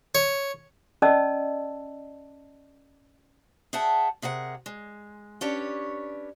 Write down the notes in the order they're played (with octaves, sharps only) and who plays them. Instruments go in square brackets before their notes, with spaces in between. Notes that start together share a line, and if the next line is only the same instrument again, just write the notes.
[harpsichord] C#5
[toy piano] C#4 D5 D#5 A5 E6
[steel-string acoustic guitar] G#4 E5 F#5 G5 A5
C3 G#4 A#4 F#5
G#3
C#4 D4 G4 B4 C#5